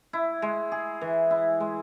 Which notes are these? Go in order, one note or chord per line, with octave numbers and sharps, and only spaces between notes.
E4
G#3
G#4
E3
E4
G#3